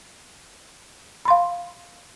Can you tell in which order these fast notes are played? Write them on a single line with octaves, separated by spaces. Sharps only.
B5 C6 F5